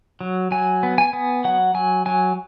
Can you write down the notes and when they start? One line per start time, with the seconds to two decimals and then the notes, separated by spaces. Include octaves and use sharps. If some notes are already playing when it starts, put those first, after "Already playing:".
0.21 F#3
0.51 F#3 G#5
0.83 B3
0.98 G#5
1.13 B3
1.45 F#3 F#5
1.74 F#3 G#5
2.06 F#3 G#5